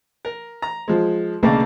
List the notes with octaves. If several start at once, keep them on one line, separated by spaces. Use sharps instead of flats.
A#4
A#5
F3 G#3
B1 C#3 A3 A#3 D4